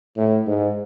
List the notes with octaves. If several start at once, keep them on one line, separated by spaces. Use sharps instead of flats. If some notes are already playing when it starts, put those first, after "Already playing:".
A2
G#2